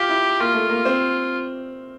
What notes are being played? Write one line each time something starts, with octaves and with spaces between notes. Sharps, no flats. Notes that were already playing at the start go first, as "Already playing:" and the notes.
Already playing: F4 G4
E4
A#3 F4
A3
A#3
C4